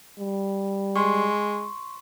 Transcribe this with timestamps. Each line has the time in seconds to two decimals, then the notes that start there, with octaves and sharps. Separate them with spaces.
0.20 G3
0.96 G#3 C6 C#6